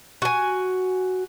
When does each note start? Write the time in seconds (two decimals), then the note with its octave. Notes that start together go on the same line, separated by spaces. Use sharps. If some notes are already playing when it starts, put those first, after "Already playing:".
0.22 F#4 G#5